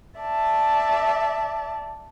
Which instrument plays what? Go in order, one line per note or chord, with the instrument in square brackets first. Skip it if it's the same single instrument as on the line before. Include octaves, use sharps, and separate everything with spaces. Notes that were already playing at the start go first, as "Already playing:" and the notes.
[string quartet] D5 E5 A5